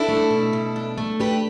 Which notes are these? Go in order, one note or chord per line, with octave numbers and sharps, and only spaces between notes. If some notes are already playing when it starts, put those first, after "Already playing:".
Already playing: D4 E4 A4
A3
B2
B2
D4
A3
D4 G4 B4